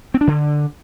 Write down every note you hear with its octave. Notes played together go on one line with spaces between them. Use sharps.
C4
D4
D3